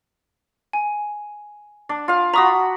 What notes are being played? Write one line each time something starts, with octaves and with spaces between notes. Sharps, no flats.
G#5
D4
F4 F5
F#4 A#5 B5 C#6 D#6